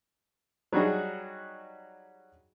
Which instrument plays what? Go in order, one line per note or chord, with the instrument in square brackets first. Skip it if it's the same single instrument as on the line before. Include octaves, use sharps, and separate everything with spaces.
[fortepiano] F#3 G3 D#4 F#4 G#4